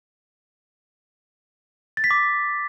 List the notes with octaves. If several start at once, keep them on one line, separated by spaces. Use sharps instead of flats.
A6
B6
D6